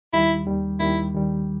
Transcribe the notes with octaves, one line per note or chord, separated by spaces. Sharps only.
D#2 D#3 G3 E4
D#2 D#3 G3
D#2 D#3 G3 E4
D#2 D#3 G3